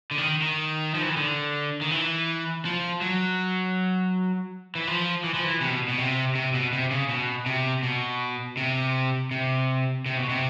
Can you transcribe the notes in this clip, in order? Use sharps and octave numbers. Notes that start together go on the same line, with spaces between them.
D3
D#3
D#3
F3
E3
D#3
D3
D#3
E3
F3
F#3
E3
F3
E3
F3
E3
C3
B2
B2
C3
C3
B2
C3
C#3
B2
C3
B2
C3
C3
C3
B2
C3